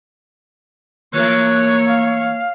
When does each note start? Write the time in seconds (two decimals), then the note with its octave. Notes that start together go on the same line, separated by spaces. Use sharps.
1.13 E3 A3 A#3 A#4 C#5 F#6
1.86 F5